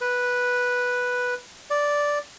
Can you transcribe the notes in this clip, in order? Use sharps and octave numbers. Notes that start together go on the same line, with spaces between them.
B4
D5